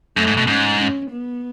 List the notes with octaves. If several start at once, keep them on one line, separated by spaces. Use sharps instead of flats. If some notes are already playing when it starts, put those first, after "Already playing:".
F#2 A3
G#2
B2
G#2 C#4
C#4
B3